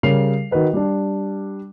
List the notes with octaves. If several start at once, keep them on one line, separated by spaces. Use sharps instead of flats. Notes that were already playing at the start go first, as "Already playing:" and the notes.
C#3 G3 A#4 C7 F7
D#3 F#4 A#4 B4 D#5
G3 D4